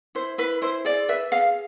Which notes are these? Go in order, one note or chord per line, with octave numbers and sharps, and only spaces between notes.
E4 C5
E4 B4
E4 C5
G#4 D5
B4 E5
G#4 F5